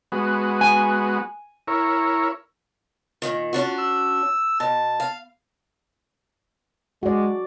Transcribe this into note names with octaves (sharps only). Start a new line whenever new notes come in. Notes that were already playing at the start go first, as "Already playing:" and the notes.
G#3 B3 F#4
G#5
E4 A#4 C#5
A#2 D#3
C#4 D4 F4 F#4
E6
B2 A5
F5
G#3 F#4 D5